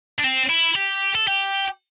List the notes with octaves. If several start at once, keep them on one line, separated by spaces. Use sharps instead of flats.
D4
C4
E4
G4
A4
G4